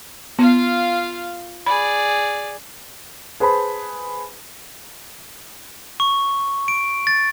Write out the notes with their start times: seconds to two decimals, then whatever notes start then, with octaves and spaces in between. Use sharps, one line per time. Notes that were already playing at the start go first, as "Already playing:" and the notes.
0.39 B3 F4 F5
1.66 G#4 D5 B5
3.40 G#4 B4 C5 A5 B5
6.00 C#6
6.68 D7
7.07 A6